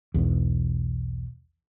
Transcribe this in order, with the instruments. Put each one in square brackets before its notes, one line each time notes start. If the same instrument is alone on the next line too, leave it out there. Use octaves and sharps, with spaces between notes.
[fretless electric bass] B1 E2